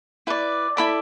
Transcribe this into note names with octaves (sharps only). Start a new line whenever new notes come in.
E4 B4 D5
E4 A4 D5 B5